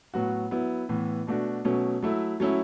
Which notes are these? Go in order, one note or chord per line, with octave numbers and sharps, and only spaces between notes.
A2 F#3 B3 F#4
F#3 B3 E4
A2 E3 B3
B2 A3 D4 F#4
B2 F#3 A3 C#4
F#3 A3 E4
F#3 A3 C#4 E4